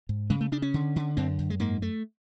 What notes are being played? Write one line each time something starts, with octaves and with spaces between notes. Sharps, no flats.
G#2
C#3 G#3
A3
C#3 D4
C#4
D3
D3
F#2 C4
F#2
G#3
G#2 A#3
A3